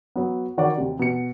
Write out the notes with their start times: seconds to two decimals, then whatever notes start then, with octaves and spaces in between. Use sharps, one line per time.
0.16 F#3 B3
0.58 D#3 F#4 C#5 D5
0.77 D#2 C3
0.99 B2 C#7